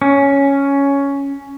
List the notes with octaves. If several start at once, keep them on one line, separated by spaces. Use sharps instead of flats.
C#4